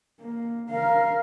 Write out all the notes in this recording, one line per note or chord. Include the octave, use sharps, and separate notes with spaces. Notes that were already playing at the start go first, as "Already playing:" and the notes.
A#3
A#4 F5